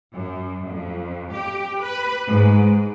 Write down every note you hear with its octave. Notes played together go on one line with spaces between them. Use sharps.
F#2
F2
G4
B4
G#2